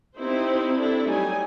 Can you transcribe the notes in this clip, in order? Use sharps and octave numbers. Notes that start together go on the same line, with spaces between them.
C4 D#4 E4 G4 C5
D4 E4 A4
F#3 G3 A3 D#4 G#5